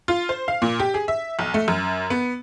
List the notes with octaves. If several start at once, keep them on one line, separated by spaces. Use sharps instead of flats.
F4
C5
F5
A#2
G4
G#4
E5
B1
A3
F#2
B3